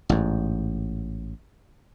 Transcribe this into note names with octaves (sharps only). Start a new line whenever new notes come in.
A1 G#2